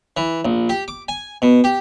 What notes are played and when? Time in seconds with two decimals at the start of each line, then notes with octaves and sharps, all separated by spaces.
0.17 E3
0.45 A#1
0.69 G4
0.88 D6
1.08 G#5
1.42 B2
1.64 G4